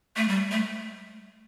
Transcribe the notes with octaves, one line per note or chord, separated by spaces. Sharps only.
A3
G3
A3